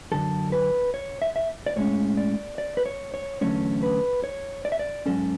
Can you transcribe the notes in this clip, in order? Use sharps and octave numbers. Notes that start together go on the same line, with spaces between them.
F#2 D3 F#3 A4
B4
C#5
E5
E5
D5
A2 G#3 C#4 C#5
D5
D5
B4
C#5
C#5
E2 D3 F#3 A3 C#4 C#5
B4
C#5
D5
E5
D5
G#2 F#3 C#4 A4